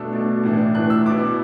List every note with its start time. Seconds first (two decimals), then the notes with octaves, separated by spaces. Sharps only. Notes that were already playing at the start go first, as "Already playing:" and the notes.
Already playing: B2 A3 D4 E6
0.13 B2 A3 D4
0.43 A2 E3 D4
0.74 A2 E3 D4 F#6
0.90 E6
1.06 B2 B3 E4 D6